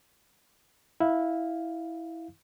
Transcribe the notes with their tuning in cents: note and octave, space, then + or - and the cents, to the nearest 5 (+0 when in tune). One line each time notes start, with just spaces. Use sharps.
E4 -10 F5 +0